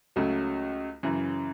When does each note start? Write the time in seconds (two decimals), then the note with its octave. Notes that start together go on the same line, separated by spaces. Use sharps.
0.16 C#2 C#3 F#3 A3
1.03 F#2 C#3 E3